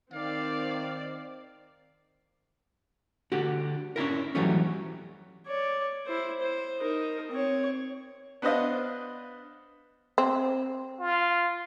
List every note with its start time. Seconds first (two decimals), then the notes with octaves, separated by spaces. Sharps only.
0.12 D#3 C4 D5 F5
3.32 D3 F#4 G4
3.96 C#4 D4 E4 A#4
4.35 E3 F#3 G3 A3 C#4
5.46 C#5 D5
6.06 E4 C5
6.41 C5
6.80 D#4 A#4
7.31 C4 C#5
8.42 B3 D4 B4 C5 D#5 F5
10.18 C4
11.00 F4